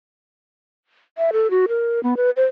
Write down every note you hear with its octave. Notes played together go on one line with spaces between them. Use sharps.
E5
A4
F#4
A#4
B3
B4
C5